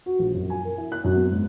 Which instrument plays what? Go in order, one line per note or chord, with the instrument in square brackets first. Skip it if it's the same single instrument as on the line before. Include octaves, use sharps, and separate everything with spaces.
[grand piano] F#4
A#1
F#2
G#5
A#4
E4
F#6
F#2
B3
G#2